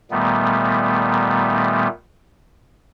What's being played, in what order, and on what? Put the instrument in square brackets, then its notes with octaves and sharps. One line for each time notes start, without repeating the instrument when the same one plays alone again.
[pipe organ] A#2 D#3 G3 A3 B3